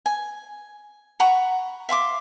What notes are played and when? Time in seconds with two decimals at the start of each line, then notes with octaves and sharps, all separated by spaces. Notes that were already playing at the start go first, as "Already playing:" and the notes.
0.06 G#5
1.20 F#5 A#5 B5 C#6
1.89 E5 F5 C6 D6